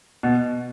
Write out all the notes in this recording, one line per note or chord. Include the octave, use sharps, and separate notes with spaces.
B2